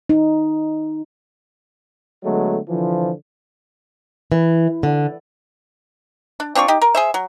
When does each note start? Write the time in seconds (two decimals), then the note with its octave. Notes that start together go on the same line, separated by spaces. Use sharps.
0.09 D#4
2.24 D3 F#3 G#3 A3 B3
2.68 D3 E3 F3
4.32 E3
4.83 D3
6.40 D4
6.55 C4 D4 F4 C#6
6.68 D#4 G4
6.82 A#4
6.95 G#4 C5 E5
7.14 F#3